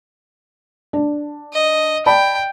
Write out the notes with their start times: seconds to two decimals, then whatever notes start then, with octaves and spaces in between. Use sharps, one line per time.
0.93 D4
1.53 D#5
2.06 D5 G5 A5 B5